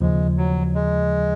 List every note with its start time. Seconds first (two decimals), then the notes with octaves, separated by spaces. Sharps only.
0.01 D#2 C#3 F3 G#3
0.37 F#3
0.75 G#3